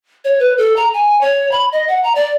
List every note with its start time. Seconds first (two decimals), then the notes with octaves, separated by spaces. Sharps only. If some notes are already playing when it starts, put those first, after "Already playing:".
0.25 C#5
0.40 B4
0.58 A4
0.76 A#5
0.94 G#5
1.21 C#5
1.52 B5
1.72 D#5
1.88 F#5
2.04 A#5
2.15 D5